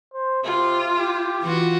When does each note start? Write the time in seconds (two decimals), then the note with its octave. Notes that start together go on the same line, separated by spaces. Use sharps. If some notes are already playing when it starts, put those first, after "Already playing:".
0.13 C5
0.44 C3 F4
0.97 G4
1.42 E3 F4 F#4